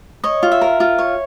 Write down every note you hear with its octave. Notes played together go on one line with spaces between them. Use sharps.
C#5 D#5
F4
E5
A#4
F4
C#5